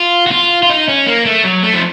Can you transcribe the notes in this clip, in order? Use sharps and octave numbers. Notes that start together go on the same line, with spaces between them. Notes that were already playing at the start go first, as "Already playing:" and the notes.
Already playing: F4
F#4
F4
F4
D#4
C#4
A#3
A3
F#3
A3
F3